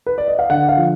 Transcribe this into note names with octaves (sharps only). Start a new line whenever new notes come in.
B4
D5
D#5
F5
D3 F#5
F5
F3